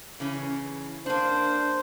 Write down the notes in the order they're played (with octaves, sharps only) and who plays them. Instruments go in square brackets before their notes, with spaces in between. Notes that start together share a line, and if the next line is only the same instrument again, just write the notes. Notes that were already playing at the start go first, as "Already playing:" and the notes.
[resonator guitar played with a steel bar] C#3 E3 C#4
[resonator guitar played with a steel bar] A#3 D4 [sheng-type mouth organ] C5